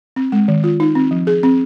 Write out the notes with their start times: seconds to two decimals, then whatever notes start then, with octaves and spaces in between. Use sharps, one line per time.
0.16 C4
0.32 G#3
0.48 D#3
0.64 F4
0.80 D#4
0.95 C4
1.11 F3
1.27 G#4
1.43 C4